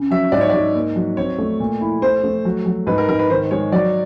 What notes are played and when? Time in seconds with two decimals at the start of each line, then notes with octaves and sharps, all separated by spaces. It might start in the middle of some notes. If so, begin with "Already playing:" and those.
Already playing: C#3
0.11 F#3 E5
0.32 G#2 D5
0.41 C#5
0.49 G#2 D5
0.75 A#3
0.96 F#3
1.17 C4 C#5
1.38 A3
1.60 A#2
1.81 E4
2.02 A3 C5
2.24 A3
2.45 F#3
2.66 F#3
2.87 G#2 B4
2.98 A#4
3.09 G#2 A#4
3.19 B4
3.30 D#3 C5
3.51 G#3 C#5
3.72 F#3 D5